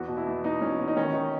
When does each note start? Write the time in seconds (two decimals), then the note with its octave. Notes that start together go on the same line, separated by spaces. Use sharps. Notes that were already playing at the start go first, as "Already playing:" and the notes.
Already playing: E2 F#4
0.08 B2
0.17 E4
0.27 E2
0.44 B2 D#4
0.61 E2 C#4
0.79 B2
0.88 D#4
0.96 D#3 C#4
1.14 D#3